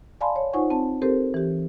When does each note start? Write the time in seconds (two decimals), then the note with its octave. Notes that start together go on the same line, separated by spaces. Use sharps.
0.21 D5 F5 G#5 A5 B5 C6
0.36 C#5
0.53 D#4 F4 C5 F#5 G#5 C#6
0.70 C4 A5
1.02 C4 G4 A4 A#4 C5
1.34 E3 G4